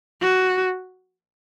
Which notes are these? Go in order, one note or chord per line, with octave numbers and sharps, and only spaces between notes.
F#4